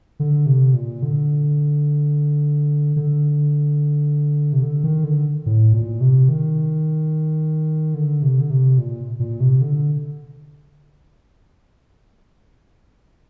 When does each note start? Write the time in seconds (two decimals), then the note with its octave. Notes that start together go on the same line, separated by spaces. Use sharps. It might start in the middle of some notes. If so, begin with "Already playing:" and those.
0.20 D3
0.46 C3
0.74 A#2
1.03 D3
2.96 D3
4.53 C3
4.63 D3
4.84 D#3
5.04 D3
5.46 A2
5.73 A#2
6.01 C3
6.29 D#3
7.94 D3
8.23 C3
8.40 D3
8.50 C3
8.78 A#2
9.20 A#2
9.40 C3
9.61 D3